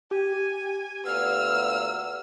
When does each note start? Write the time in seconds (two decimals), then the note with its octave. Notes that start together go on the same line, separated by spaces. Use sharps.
0.11 G4 G#5
1.06 D2 A#2 B3 E6 F6